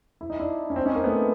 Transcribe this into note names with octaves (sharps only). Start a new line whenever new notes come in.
E4
D#4
D4 E4
C#4
C4 D4
C#4 D#4
A#3 C4
A3 B3